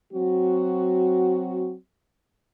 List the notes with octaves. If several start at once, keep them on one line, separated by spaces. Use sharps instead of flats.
F#3 C4 F#4